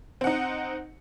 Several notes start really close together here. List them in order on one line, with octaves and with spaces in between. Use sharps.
C4 F#5 D#4